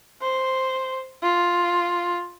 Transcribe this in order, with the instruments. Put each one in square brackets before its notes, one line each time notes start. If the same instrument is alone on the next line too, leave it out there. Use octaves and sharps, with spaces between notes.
[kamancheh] C5
F4